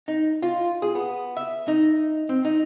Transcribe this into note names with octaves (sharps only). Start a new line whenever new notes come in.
D#4
F4
G#4
B3
E5
D#4
C4
D#4